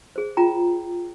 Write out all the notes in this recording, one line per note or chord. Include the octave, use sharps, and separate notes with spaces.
G#4 C5
F4 G5 A#5